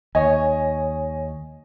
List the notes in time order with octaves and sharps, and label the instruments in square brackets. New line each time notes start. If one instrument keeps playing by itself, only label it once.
[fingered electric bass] D#2 [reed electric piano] C#5 G#5 [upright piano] D#5